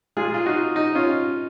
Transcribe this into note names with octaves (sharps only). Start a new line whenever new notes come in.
A#2 G#3 F4 G#4
F4
D#4 F#4
D#4
C#4 F4